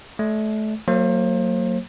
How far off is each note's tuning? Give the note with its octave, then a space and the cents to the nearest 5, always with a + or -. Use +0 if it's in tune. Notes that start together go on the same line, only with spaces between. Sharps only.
A3 -30 D5 +0
F#3 +0 A#3 -30 C5 +30